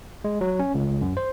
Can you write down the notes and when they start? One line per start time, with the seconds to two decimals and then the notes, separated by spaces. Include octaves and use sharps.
0.24 G#3
0.41 F#3
0.59 C#4
0.74 C#2
1.01 F#2
1.17 C5